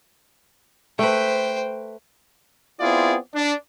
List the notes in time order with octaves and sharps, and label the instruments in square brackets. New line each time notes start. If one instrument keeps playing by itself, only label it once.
[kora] A3 B4 [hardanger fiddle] C5 G5
[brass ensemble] B3 C4 E4 F4 G#4 D5
D4